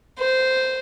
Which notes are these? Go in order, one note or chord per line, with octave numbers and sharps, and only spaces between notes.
C5